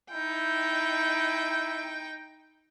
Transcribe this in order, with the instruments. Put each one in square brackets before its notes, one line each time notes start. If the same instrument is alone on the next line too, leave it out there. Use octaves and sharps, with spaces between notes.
[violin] D#4 G5 [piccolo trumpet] E4